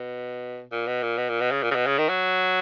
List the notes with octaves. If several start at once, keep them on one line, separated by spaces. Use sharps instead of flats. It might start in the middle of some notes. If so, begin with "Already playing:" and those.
Already playing: B2
A#2
B2
A#2
B2
A#2
B2
C#3
A#2
C#3
B2
C#3
D#3
F#3